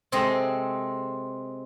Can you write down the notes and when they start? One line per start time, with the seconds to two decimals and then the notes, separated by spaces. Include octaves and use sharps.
0.12 C3 G#3 C4 A4 D#5 A#5